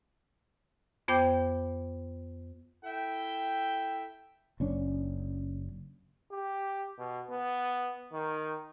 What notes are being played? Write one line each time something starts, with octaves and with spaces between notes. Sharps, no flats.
F2 B3 C5 G5 D6 G6
E4 A4 E5 G5
F#1 C#4 D4
G4
B2
B3
D#3